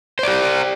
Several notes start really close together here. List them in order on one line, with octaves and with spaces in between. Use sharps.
C5 D5 G4